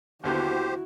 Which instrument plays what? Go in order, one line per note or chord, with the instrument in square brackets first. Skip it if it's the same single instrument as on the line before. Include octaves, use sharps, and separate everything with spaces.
[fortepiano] D#2 D3 B3 [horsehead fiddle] E4 F#4 [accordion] G4 C5